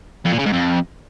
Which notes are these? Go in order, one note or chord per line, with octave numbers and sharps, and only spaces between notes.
F2
A#2
C#3
G#2
F2